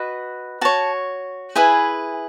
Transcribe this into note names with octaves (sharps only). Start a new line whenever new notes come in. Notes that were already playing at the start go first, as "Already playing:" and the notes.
Already playing: F#4 B4 D#5
F#4 C#5 A5
E4 G#4 B4 G#5